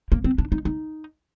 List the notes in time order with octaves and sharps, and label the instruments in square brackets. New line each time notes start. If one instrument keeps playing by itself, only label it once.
[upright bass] A#3
C4
D4
D#4
D#4